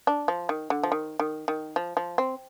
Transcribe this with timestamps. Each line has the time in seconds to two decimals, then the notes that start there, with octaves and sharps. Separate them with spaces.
0.07 D4
0.28 F3
0.49 D#3
0.70 D3
0.83 F3
0.92 D#3
1.20 D#3
1.48 D#3
1.76 F3
1.97 F3
2.18 C4